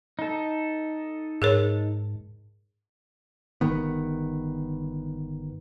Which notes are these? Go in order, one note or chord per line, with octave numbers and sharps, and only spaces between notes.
D#4 A4
G#2 G#4 A#4 C#5
G1 D#3 B3